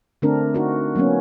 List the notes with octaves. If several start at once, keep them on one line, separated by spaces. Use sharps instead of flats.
D3 A3 C4 D4 A#4
D#4 F#4 A#4
F#3 A#3 B3 C#4